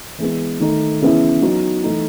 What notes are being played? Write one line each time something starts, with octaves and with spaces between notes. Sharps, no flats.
E3 G#3 B3
D#3 A3 D#4
C#3 E3 B3 E4
F#3 B3 D#4
E3 A3 D#4